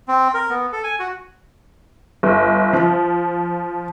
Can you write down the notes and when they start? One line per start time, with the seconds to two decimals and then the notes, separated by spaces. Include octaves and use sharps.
0.08 C4
0.34 A#4
0.50 B3
0.72 A4
0.84 G#5
0.99 F#4
2.23 G1
2.73 F3